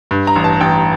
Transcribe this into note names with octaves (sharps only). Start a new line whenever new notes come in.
G2
A#5
A1
A5
A1 G5